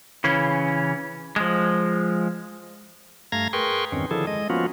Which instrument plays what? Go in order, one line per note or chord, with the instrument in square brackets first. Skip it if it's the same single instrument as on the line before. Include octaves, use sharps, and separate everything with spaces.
[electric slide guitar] C#3 E3 C#4
F3 G#3
[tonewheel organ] G2 A3 F5 A#5 G#6 A#6
G#4 A#4 B4 G5 C6 C#6
E2 G2 D#3 C4 C#4
D3 D#3 F3 E4 G#4 A4
G#3 D#5
F3 A#3 B3 C#4 F4 F#4